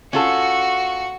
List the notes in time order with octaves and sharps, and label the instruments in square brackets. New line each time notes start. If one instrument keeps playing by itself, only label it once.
[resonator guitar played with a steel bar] C#4 F4 A4 [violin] F#4 C#7